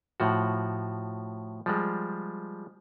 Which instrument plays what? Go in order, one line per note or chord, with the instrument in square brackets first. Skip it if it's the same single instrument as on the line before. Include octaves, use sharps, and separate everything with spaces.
[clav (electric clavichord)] A2 F3 F#4
F3 G3 G#3